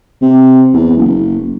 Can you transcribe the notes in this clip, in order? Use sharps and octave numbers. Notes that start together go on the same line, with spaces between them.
C3
E2
F#1